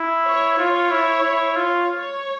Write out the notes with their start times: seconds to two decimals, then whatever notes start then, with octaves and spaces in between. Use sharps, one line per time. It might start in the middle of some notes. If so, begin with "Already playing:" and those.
Already playing: E4
0.25 C#5
0.58 F4 C#5
0.91 E4
1.23 E4
1.56 F4
1.89 C#5